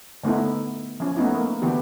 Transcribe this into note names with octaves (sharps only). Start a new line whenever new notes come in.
D3 A3 B3 D#4 E4
F3 C#4
A3 B3 C#4 D#4 E4
A#3
D3 E3 B3 G4